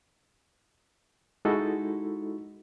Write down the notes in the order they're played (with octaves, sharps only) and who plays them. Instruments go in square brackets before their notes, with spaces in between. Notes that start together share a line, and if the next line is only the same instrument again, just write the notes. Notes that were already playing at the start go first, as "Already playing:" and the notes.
[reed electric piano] G#3 D#4 E4 F#4 A4